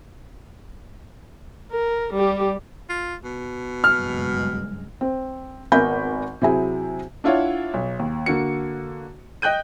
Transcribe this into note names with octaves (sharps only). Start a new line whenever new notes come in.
A#4
G3 G4
F4
B2
F#1 G2 G#3 F6
C4
G#1 B3 A#4 G#5 B5 G6
C3 F#3 E4 G#4 G#5
D4 E4 F4 C#5 F#5
B1
D#2
D3 A#3 F#4 C#7
D#5 G5 F#6 G6 D#7